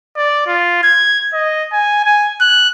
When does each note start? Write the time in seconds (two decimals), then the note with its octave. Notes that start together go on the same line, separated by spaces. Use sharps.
0.16 D5
0.47 F4
0.83 G#6
1.33 D#5
1.72 G#5
2.04 G#5
2.41 F#6